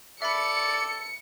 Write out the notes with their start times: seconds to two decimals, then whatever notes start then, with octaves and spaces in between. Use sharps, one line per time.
0.22 A4 D5 E5 B5 C#7